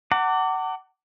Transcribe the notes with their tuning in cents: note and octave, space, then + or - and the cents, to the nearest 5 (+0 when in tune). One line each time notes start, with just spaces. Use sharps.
F#5 +25 A5 +45 D6 -10